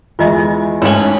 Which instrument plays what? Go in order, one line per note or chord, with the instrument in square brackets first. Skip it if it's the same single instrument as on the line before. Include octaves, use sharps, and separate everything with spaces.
[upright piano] E2 E3 G#3 [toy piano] F4 D#5 E5
[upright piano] G#2 F#7 [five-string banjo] A3 C#4 [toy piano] D4 C#5